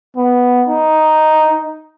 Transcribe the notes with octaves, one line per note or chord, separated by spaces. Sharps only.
B3
D#4